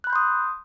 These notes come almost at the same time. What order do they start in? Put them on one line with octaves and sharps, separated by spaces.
F#6 B5 G6 C6 D#6